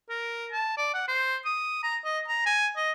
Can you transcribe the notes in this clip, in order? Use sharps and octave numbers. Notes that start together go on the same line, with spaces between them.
A#4
A5
D5
F#5
C5
D#6
A#5
D#5
A#5
G#5
D#5